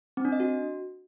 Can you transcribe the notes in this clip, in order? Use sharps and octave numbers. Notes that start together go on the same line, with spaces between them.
C4
D4
D#5
F#4